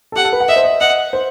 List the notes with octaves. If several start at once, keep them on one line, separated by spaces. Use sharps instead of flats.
A4
G4 F#5
A4
B4
F#5
D#5 E5
C5
D#5
D#5 F#5
C5